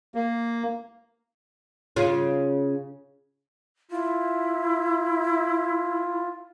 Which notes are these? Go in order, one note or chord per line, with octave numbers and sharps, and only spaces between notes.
A#3
C#3 F4
E4 F4